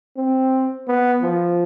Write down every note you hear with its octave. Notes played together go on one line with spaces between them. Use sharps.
C4
B3
F3